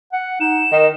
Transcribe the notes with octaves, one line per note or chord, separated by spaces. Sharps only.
F#5
D#4 E7
D#3 A#4